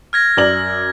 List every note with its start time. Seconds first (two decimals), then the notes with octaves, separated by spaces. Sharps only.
0.13 F6 G#6 A#6
0.37 F#2 D5 F#7